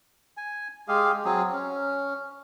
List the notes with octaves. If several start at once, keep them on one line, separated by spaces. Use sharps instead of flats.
G#5
G#3 G4 G#4 F5
F#3 C4 G#4
C#4